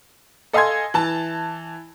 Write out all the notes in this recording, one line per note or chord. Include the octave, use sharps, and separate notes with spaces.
A4 D#5 F5 G#5 C6 G#6
E3 A5